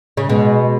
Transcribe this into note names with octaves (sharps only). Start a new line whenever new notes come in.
C#3
B2 G#3